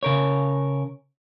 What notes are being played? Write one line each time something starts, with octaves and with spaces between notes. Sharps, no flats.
C#3 A#4 C#5